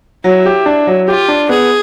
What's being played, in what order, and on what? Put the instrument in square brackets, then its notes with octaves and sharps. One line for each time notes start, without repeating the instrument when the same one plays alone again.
[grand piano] F#3 [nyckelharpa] E4
[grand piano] G4
D4
F#3
[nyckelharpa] F4 [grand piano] G4
[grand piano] D4
[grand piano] B3 [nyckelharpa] G#4